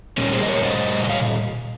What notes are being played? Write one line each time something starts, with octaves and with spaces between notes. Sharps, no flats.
A#2 G3 A#3 C#4
G#4 C5
D#5
A#4 C#5
C5 D#5
D#5
C#5 F5